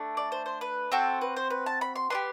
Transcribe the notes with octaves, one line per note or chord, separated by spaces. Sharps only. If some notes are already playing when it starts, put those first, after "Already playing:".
Already playing: A3 D4
D5
C5
C5
B4
C4 F#4 A4
B4
C5
B4
A5
B5
C6
B3 D4 G4 C6